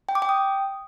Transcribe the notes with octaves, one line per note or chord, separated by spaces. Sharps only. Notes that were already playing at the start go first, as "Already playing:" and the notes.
G5
D6
G5
D#6